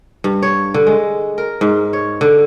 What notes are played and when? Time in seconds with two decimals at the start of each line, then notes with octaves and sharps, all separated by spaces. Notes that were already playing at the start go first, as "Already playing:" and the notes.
0.24 G2
0.42 C#5
0.74 D3
0.87 G#3
1.38 A#4
1.61 G#2
1.93 C#5
2.21 D3